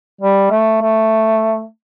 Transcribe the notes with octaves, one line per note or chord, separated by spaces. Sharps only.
G3
A3
A3